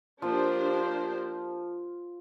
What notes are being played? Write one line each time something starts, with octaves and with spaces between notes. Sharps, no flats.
F3 A#3 D4 G4 C5